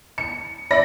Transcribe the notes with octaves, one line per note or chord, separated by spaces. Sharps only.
C#7
D5 E5 B5 A#6